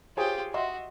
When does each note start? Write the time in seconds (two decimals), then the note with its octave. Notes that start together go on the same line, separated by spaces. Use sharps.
0.17 F4 G4 G#4 C5 C#5
0.54 F#4 D#5 E5 C6